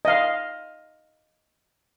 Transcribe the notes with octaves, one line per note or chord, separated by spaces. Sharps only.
D#5 F5